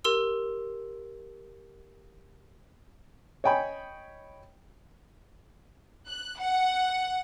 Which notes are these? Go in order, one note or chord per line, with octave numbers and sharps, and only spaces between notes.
G4 A#4 C6 E6
C#5 D#5 G5 G#5 B5
F#6
F#5